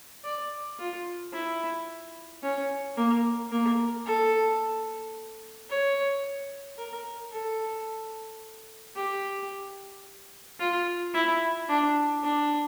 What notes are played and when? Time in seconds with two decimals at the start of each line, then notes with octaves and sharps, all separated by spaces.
0.25 D5
0.79 F4
1.33 E4
2.43 C#4
2.97 A#3
3.52 A#3
4.06 A4
5.69 C#5
6.78 A#4
7.33 A4
8.96 G4
10.59 F4
11.14 E4
11.69 D4
12.23 D4